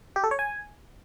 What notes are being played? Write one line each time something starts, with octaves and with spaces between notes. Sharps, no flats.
G4
A4
C#5
G#5